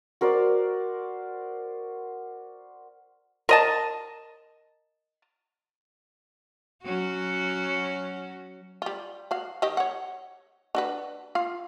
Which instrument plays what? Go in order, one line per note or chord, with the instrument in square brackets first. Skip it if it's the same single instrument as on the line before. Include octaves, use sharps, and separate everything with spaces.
[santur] F#4 A#4 C5 D5
[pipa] A#4 D#5 A5
[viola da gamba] F#3 C#4 F#4
[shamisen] G3 F4
F#4 F5
D#3 G4 D#5
C#5 F#5
D4 F#4 B4
F4 F5